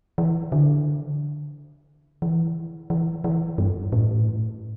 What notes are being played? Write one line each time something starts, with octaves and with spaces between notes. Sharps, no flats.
E3
D3
E3
E3
E3
G2
A2